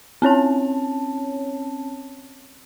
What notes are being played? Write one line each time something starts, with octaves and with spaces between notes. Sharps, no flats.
C4 C#4 C#5 A5